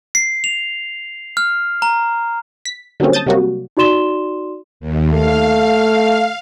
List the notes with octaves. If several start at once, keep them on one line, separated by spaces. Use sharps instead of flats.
C7
F7
F6
A#5
B6
D3 F#3 G3 A#3 C4 C#4
A5 D#6 G6 A6
C3 F#3 G3 A#3 F#4
D#4 F#4 D5 C6 E7 G7
D#2
A3 F5